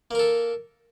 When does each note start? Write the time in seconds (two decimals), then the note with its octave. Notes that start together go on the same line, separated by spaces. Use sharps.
0.11 A#3
0.15 A#4
0.19 A4